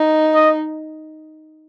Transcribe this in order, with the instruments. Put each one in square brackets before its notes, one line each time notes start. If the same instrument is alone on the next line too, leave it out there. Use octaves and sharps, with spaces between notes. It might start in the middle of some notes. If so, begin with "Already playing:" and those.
Already playing: [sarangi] D#4
[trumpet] D#5